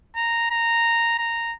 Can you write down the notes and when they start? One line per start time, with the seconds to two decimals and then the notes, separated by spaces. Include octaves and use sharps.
0.16 A#5
0.51 A#5
1.19 A#5